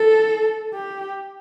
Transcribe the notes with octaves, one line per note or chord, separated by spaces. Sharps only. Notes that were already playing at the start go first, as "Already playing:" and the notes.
Already playing: A4
G4